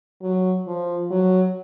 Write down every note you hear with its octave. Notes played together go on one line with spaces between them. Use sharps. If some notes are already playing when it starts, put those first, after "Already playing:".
F#3
F3
F#3